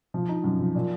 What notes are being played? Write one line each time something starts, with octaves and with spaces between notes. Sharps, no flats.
F3
D#4
F#2
F3
A#2